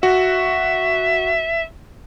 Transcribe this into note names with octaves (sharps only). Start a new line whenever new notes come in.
F#4 E5